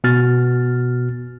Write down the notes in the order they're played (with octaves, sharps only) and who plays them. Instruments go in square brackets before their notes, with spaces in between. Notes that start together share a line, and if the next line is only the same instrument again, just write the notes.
[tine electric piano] B2 B3 F#4 F6 A6